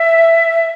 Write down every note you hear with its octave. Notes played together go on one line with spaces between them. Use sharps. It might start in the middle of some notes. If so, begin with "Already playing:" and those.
Already playing: E5